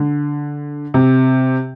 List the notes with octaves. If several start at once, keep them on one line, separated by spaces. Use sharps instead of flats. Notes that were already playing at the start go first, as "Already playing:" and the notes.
Already playing: D3
C3